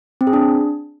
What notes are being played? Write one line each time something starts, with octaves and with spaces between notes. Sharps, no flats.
C4
G#4
D4